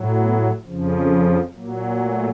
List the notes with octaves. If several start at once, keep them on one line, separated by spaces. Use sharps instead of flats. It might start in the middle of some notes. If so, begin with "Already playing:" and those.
Already playing: A2 F#3
B3
F2 C#3 F3
A#2 F#3 A#3
A3